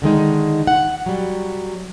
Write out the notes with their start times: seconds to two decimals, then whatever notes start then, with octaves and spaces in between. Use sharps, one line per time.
0.02 D3 D#3 G#3 D#4
0.67 F#5
1.06 F#3 G3